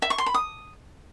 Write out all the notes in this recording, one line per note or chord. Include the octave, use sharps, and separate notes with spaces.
E5
C#6
C6
B5
D#6